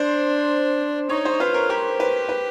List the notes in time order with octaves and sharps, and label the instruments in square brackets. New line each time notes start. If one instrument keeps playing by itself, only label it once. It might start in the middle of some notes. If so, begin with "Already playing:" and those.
Already playing: [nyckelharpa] D4 [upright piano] C5
[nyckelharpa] D#4 [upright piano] C#5
[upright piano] C5
[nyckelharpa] F4 [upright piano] B4
[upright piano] A#4
[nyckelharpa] G4 [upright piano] A#4
[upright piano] B4
B4